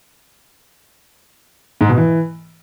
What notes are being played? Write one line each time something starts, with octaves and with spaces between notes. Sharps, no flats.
G#2
B2
E3